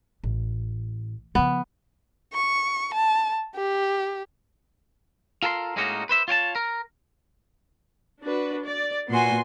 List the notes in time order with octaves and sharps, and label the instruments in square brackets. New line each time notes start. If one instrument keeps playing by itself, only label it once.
[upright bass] A1
[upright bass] C#3 F3 [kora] B3
[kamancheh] C#6
A5
G4
[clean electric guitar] F4 A4 A#4 A5 C6
A2 G#3 A#3 C#4 D#4 F#4
B4 C5 E5
F4 C#5 G5 A5
A#4
[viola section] D4 F#4 B4
D5
[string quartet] A#2 F#4 G#5 [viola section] B3 C6